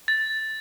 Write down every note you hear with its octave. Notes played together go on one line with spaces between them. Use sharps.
A6